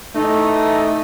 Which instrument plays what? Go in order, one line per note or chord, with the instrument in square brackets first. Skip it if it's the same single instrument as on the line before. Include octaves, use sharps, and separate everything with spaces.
[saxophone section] A2 E3 D#4 [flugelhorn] A3